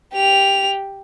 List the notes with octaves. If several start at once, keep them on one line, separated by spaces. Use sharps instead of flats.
G4 F7